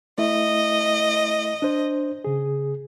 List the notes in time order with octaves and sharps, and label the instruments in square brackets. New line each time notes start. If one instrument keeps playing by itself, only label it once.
[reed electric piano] A3 E4 E5 [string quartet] D#5
[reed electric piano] D4 C5
C#3 G#4